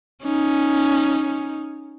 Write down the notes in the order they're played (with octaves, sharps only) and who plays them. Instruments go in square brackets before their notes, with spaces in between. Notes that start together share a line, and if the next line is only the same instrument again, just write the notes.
[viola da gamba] C#4 D#4